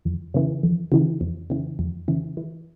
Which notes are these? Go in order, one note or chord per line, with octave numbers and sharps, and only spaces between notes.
F2
C#3 E3
F2
C#3 E3
F2
C#3 E3
F2
C#3 E3
E3